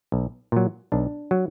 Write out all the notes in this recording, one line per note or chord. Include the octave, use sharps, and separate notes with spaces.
B1
A#2 F#3
B1 D4
F#3